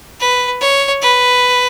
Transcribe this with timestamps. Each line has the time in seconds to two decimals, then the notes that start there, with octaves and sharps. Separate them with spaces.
0.20 B4
0.61 C#5
1.02 B4